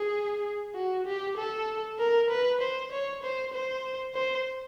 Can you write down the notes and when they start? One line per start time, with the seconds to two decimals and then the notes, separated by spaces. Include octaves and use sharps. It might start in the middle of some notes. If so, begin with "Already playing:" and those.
Already playing: G#4
0.75 F#4
1.06 G4
1.37 A4
2.00 A#4
2.30 B4
2.61 C5
2.92 C#5
3.23 C5
3.54 C5
4.15 C5